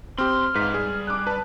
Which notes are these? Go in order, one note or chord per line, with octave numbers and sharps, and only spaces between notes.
C4 G4 C6 F6
G#2 B4 F5 B6
G3 G#4
D6 F#6
B4 A5